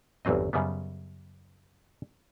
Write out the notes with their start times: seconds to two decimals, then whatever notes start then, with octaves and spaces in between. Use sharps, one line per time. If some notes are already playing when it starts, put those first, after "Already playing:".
0.25 G1 E2 F#3 C4 D#5
0.53 F#2 C#3 G3 B3